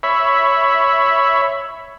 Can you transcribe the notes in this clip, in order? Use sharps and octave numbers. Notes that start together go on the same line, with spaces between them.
C#5 E5 B5